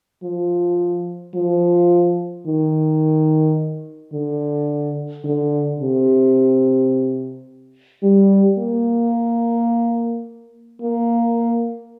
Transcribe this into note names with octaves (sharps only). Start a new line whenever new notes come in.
F3
F3
D#3
D3
D3
C3
G3
A#3
A#3